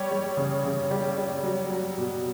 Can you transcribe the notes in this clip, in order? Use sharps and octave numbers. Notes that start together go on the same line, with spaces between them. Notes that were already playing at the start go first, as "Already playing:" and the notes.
Already playing: G3 C#5
G3
C#3
C#3
G3
G3
F#3
F#3
B2